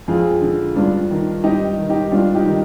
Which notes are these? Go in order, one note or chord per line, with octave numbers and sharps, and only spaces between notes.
F2 F4 G#4
D3
G2 D4 F4
D#3
G2 D#4 G4
D#3
D#4 G4
G2 D4 F4
D#4 G4
D#3